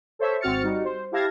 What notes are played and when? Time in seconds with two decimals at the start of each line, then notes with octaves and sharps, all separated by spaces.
0.19 A4 C5 C#5 E5
0.41 G#1 C4 F#4 F6 A6 C#7
0.63 G3 D#4 F#4
0.84 C5
1.12 E4 G4 F5 A5 G#6 A#6